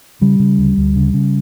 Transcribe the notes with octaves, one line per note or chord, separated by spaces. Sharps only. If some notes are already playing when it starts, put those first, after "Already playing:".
C#3 G3
C#3
D2
D2
C#3
C#3